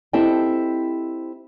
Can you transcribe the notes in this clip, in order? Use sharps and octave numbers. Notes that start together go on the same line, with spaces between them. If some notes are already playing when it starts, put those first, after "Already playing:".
C4 E4 G4 A4 D#5 G5